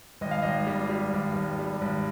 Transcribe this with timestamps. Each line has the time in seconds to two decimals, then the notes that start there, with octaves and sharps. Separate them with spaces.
0.21 G#1 D#5
0.31 F5
0.42 G#1 D#5
0.67 G3
0.89 G3
1.13 G#1
1.36 G#1
1.59 G3
1.81 G#1